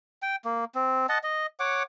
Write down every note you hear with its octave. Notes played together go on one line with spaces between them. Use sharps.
G5
A#3
C4
D#5 F#5 A5
D#5
C#5 F#5 D6